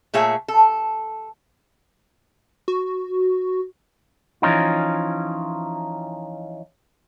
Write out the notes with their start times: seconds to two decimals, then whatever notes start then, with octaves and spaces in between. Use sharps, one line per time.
0.14 A#2 A3 G#4 C#5 E5
0.48 A4
2.68 F#4
4.42 E3 F3 C#4 D#4 F4